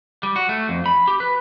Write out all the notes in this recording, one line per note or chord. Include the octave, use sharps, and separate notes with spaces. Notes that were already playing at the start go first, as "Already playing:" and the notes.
G3
F#4
A3
F2
B5
G4
B4